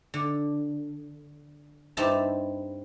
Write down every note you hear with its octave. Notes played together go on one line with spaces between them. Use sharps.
D3
G2 C4 D#4 E4 C5 A5